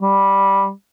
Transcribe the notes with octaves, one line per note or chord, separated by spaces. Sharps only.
G3